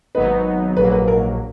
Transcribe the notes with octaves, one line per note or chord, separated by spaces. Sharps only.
G#1 G#2 F#3 B3 D#4 B4
A#1 G#2 F#3 A#3 B4
B4
A#4